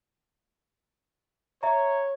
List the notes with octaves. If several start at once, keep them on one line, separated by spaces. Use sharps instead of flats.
C#5 E5 A#5